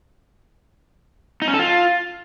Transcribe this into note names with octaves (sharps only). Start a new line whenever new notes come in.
D#4
C#4
A4
F4